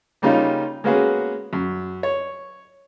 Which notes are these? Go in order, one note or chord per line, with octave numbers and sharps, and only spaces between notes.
C#3 G3 A#3 C#4 D#4 F4
G#3 A#3 B3 C#4 F#4 G#4
F#2
C#5